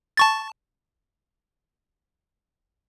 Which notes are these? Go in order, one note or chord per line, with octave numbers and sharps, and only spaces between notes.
A5 C#6 A6